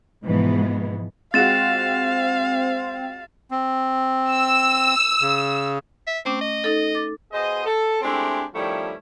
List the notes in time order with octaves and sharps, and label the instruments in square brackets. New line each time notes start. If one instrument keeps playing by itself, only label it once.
[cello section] G#2 B2 E3 F3 G#3 B3
[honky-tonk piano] G#3 F4 F#4 [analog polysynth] C4 [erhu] F5 [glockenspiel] A6 E7
[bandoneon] C4
[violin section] E6
[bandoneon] C#3
[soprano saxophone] E5
[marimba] A3 C#4 D6 [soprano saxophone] C4
[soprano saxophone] D#5
[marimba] D#4 A4
D6 A6
[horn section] B2 G#4 C5 D#5
A4
G#3 A3 C4 D4 E4 G4
D#3 F3 G3 A3 C#4 E4